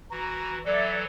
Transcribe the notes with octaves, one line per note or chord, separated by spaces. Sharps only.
E3 F#4 A#5
E3 F#3 A4 D5 E5